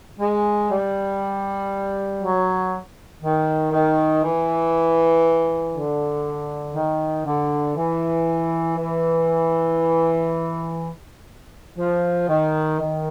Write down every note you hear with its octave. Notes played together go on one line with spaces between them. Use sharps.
G#3
G3
F#3
D#3
D#3
E3
D3
D#3
D3
E3
E3
F3
D#3
D#3